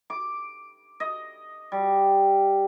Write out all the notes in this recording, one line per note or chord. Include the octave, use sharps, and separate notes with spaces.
D6
D#5
G3